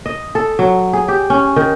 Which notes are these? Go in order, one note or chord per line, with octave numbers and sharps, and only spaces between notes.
D#5
A4
F#3
G#4
G4
C#4
D#3